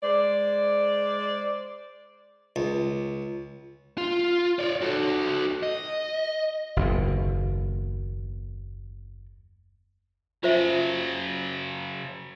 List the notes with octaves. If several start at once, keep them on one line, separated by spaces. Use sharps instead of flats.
G#3 C5 D5
C#2
F4
C#5 D5
F#4 A4
D#5
F#1 D#2 B2
C#3 F#3 F4 C5 E5